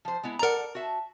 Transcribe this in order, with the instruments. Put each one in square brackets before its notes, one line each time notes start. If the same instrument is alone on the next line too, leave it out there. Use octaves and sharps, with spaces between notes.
[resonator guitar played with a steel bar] F3 C5
G#3 B3 E4
[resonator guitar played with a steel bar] A4 D5 F#5 [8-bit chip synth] A#4 A#5
[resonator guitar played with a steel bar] F#4 E5 A5